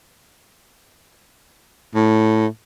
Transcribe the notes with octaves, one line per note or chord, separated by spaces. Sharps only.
A2